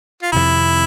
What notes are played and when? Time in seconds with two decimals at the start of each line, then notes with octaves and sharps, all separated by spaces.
0.23 F4
0.32 F2 C3 D#3 E4